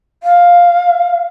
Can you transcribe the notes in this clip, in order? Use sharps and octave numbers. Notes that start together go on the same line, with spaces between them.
F5